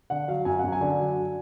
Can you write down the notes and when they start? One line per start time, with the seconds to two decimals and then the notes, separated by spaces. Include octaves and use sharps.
0.10 D3 F#5
0.28 F#3 F5
0.45 F#2 G#5
0.59 F#2 F#5
0.72 G#5
0.81 D3
0.99 F#3